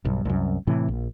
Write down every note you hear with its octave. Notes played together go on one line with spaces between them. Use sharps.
B1 G2
C2 F#2
A2 C3 E3
A#1